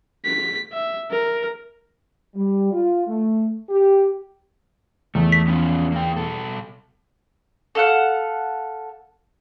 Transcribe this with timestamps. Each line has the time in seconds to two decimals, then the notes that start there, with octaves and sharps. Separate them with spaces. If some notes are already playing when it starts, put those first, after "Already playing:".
0.25 B6
0.73 E5
1.11 A#4
2.35 G3
2.72 F4
3.07 A3
3.70 G4
5.15 E2 A3
5.32 B6
5.48 B3 C#4 F4
5.92 A#3 G5
6.16 B2 A4
7.75 A4 F5 F#5